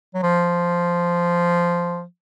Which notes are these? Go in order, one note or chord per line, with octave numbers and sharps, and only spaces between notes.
F#3
F3